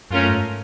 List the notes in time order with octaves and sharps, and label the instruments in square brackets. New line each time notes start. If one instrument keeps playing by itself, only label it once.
[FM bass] F#2 [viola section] A3 C#4 F4 A#4
[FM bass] G#2